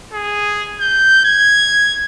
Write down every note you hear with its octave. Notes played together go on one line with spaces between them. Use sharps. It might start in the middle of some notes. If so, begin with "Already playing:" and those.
G#4
G6
G#6